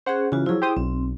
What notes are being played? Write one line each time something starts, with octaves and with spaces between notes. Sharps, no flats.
C#4 G#4 C5 F#5
C#3 E3 F4 F#4
F3 F#3 E4 G#4
G4 C5 D#6
B1 C4